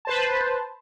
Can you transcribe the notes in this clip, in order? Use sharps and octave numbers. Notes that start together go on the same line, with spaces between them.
B4 C5 A5